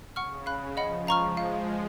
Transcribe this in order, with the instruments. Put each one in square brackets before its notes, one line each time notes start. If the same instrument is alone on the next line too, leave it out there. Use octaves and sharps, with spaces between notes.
[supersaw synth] C#3 [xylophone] F#5 C#6 F6
[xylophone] F5 B5 F#6
[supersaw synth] F3 [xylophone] D#5 F#5 B5
[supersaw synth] G#3 [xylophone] F5 A#5 C#6 F6
[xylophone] F5